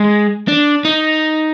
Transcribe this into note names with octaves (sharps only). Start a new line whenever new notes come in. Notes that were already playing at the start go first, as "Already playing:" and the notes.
Already playing: G#3
D4
D#4